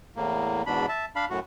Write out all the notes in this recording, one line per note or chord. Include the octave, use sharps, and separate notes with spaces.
E2 A2 A#3
E2 G#2 B2 D4 B5
E5 A5
D4 F5 B5
F#2 A2 F#4